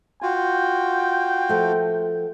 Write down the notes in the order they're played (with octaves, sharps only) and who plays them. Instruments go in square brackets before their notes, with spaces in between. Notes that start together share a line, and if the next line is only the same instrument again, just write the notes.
[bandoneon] F4 F#4 [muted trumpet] G5
[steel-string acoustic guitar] F3 A3